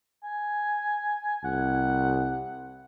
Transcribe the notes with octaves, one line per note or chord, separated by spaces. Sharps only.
G#5
C2 F#5